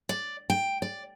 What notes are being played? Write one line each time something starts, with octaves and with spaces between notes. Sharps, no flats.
D5
G5
D5